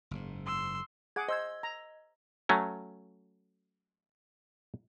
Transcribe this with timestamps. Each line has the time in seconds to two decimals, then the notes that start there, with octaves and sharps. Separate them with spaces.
0.11 F#1 G#2
0.46 C6 E6
1.16 G#4 F#5 D6 G#6
1.28 C5 D#5 E6 G#6
1.63 A#5
2.49 F#3 A3 C#4